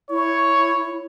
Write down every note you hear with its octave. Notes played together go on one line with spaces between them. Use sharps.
E4 C#5